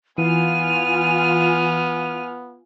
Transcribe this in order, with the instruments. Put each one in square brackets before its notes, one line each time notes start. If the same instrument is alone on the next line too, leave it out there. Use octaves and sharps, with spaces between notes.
[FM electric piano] E3 [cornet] B3 [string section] F4 G#5 F6 [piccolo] D#7